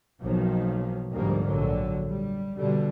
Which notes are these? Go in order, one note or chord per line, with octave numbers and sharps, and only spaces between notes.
B1 D#3 F3 F#3 A#3
G1 D2 G#2 F3 G3 A#3
A#1 D3 F#3
G3
B2 D3 G3